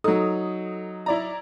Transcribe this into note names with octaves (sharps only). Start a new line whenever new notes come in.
F#3 D#4 A4 D#6
E4 D5 A#5